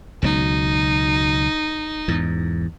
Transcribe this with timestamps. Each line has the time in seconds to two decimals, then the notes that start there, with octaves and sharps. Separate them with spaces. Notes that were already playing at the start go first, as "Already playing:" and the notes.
0.22 C#2 B2 F#3 D#4
2.08 E2 G#2